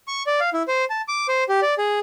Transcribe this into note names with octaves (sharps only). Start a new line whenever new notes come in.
C#6
D5
F5
E4
C5
A5
D6
C5
G4
D5
G#4